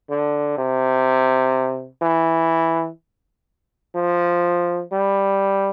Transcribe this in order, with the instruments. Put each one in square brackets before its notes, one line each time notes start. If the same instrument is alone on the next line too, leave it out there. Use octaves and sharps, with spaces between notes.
[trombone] D3
C3
E3
F3
G3